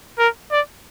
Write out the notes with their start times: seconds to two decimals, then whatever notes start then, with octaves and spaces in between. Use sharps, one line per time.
0.19 A#4
0.51 D5